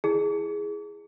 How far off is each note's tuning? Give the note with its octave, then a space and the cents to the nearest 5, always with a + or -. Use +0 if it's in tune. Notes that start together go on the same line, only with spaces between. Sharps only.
E4 +0 G#4 +0